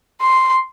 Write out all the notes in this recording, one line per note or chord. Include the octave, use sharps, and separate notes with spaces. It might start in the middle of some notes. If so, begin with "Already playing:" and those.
C6